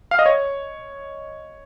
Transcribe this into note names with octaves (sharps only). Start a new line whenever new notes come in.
F5
D#5
C#5